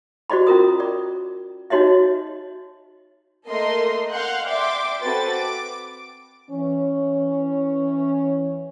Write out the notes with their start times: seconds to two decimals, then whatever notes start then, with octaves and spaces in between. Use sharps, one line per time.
0.30 F#4 C5 D5 D#5 B5
0.47 C#4 F4 A#4 D#6
0.80 D5
1.70 D#4 F#4 C#5 D#5 E5
3.48 A3 A#3 A4 A#4 D#5 C6
4.12 F5 F#5 C6 F#6 G6
4.47 D5 E5 G5 C6 D6
5.02 C4 F#4 A4 B4 A6
5.30 D6
6.50 E3 C#4 C#5